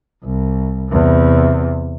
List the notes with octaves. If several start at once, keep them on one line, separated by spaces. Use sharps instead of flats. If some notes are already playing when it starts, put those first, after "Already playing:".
C2
E2 C3